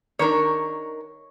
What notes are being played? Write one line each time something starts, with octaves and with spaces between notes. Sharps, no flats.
D#3 D4 A#4 C#5